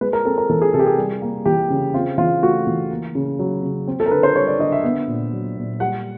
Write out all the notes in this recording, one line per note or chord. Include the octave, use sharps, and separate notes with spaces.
G#3 B4
A#4
C4 A4
A#4
E3 A4
G#4
C3 A4
G4
G#4
G3
A#3
E3 G4
C#3
C4 F4
E3 F4
A3 F#4
E3
A#3
C#3
F#3
C#3
C4
A4
A#4
D3 B4
C5
G3 C#5
D5
D3 D#5
E5
B3
A#2
F#3
A#2
G3 F#5